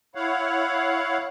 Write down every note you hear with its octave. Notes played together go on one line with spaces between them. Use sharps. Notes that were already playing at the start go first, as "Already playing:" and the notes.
E4 C#5 F5 F#5